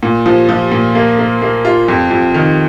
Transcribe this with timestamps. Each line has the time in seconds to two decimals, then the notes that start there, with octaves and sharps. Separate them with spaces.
0.03 A#2
0.26 F3
0.49 F3
0.71 A#2
0.95 A#3
1.18 A#3
1.42 A#3
1.65 F4
1.88 F2
2.11 F2
2.34 D#3